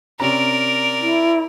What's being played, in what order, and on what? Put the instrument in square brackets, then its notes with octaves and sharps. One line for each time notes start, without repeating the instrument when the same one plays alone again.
[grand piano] C3 C#4 A#5 [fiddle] A#4 D5
[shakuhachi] E4